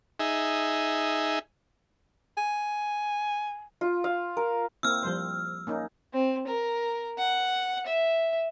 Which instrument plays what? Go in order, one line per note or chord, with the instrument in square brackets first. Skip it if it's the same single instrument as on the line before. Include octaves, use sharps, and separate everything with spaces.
[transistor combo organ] D#4 G#4 E5
[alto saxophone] G#5
[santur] F4
F5
A#4
[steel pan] A#3 C4 E4 [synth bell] E6 F6
[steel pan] F3 G3 C5
A#3 C#4 D#4
[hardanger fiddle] C4
A#4
F#5
E5